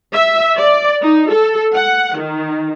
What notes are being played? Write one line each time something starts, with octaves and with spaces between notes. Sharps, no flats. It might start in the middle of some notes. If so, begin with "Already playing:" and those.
E5
D5
D#4
A4
F#5
D#3